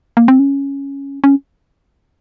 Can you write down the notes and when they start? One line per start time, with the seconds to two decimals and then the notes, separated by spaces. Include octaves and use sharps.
0.17 A#3
0.28 C4
0.39 C#4
1.24 C#4